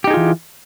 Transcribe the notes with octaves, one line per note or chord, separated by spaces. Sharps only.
E3 D#4 F4 G4 G#4